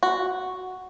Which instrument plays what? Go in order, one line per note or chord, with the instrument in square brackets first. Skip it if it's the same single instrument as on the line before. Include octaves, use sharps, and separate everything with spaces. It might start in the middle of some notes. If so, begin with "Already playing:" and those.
[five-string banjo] F#4